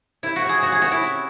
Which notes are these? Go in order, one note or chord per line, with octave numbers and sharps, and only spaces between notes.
C3 E4
F#4
C3
G#4
C3 F#4
G#4
C3 F#4
E4
C#4